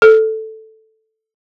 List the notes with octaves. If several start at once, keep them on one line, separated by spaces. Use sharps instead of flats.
A4